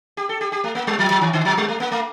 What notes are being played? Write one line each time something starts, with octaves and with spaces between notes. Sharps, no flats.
G4
A4
G4
G4
A3
A#3
G3
F3
F3
D#3
D3
F3
G3
A3
A#3
A3